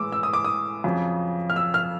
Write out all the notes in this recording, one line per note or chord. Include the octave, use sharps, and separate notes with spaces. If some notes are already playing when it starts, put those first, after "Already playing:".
Already playing: A2 E3 G#3 D6 E6
E6
D#6
D6
D#6
F2 C#3 F#3
F6
E6
F6